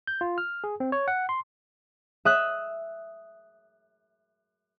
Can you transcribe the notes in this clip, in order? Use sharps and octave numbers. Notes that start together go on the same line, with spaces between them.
G6
F4
F6
G#4
C4
C#5
F#5
C6
E5 D#6 F#6